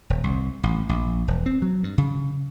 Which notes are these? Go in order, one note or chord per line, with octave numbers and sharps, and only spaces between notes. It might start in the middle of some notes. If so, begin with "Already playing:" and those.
D#1
C2
A1
A#1
E1
C4
F#3
G2
C#3